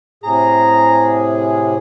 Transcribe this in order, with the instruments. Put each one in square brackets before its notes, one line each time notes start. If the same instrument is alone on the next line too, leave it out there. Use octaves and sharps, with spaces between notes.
[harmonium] A2 C3 G#4 [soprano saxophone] A#5